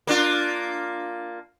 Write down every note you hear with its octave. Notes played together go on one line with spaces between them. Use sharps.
A#3 D4 F4